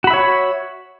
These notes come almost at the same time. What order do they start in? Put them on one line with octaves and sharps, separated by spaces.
F#4 B5 E5 C#5